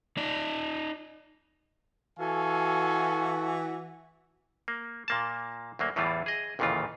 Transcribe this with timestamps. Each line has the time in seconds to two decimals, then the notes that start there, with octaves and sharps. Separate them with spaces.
0.17 D#4 D5
2.19 E3 F#4 A4 F5 G#5 C#6
4.68 A#3
5.08 A#2 A#3 A5
5.79 D2 F#3 A#3
5.96 E2 A2 E3 G3 F4
6.26 G#4 D#5
6.59 A1 D#2 A#2 C#3 E3 F4